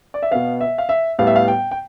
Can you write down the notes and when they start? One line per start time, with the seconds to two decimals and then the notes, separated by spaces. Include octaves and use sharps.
0.14 D5
0.23 E5
0.31 B2 B3 F5
0.61 E5
0.78 F5
0.89 E5
1.19 A2 G3 B3 F5
1.27 E5
1.36 F5
1.48 G5
1.71 G5